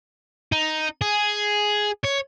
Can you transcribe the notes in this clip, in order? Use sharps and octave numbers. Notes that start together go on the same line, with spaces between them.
D#4
G#4
C#5